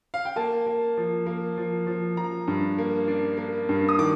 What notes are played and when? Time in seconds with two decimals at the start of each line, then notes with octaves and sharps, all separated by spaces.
0.14 F5
0.25 G5
0.36 A#3 A5
0.67 A#3
0.97 F3
1.26 A#3
1.57 F3
1.87 F3
2.17 F3 A#5
2.47 G2
2.78 A#3
3.08 D4
3.37 A#3
3.69 G2
3.89 D#6
3.99 D#3 D6